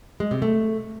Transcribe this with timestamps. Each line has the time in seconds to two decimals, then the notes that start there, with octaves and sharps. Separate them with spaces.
0.20 G#3
0.31 C3
0.42 A3